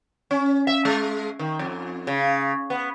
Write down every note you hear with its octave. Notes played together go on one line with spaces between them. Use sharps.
C#4
E5
G#3
D#3
F2
C#3
B3